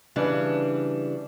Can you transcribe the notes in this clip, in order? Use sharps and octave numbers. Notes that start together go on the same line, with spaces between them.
C#3 E3 G3 D4